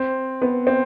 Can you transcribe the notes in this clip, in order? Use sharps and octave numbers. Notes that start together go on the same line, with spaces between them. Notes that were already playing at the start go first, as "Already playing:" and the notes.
Already playing: C4
B3
C4